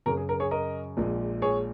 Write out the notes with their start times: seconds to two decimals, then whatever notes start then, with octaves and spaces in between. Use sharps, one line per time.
0.06 F#2 C#3 F#3 A#4
0.17 G#4
0.29 A#4
0.40 G#4 C#5
0.51 A#4 D#5
0.97 A#1 A#2 G#3
1.42 G#4 C#5